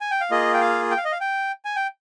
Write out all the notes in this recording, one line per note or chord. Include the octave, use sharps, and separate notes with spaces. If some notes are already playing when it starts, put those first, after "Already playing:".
G#5
G5
F5
A#3 F4 G#4 D#5
G5
F5
G5
F5
D#5
F5
G5
G#5
G5